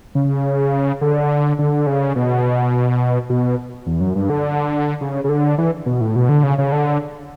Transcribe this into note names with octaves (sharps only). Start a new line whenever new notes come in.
C#3
D3
D3
C#3
B2
B2
E2
F#2
G2
D3
C#3
C#3
D3
E3
B2
A2
B2
D3
C#3
C#3
D3